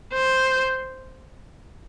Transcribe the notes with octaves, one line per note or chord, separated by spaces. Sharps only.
C5